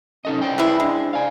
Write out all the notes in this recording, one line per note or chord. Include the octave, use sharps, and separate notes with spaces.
C#4 D#4 A4 D#5
C5 D5 G5
E3 G#3 E4
G#3 D4
D5 F5 G#5